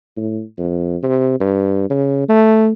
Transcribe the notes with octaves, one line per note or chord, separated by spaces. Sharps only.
A2
F2
C3
G2
C#3
A3